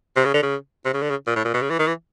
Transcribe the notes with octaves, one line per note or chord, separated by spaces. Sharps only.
C3
C#3
D3
C#3
C3
C#3
D3
C#3
A#2
A2
A#2
B2
C#3
E3
D#3
E3